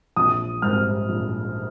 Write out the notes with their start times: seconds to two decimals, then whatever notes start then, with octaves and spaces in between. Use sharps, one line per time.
0.16 A#1 D#6
0.62 G#2 G3 F6
1.09 A#1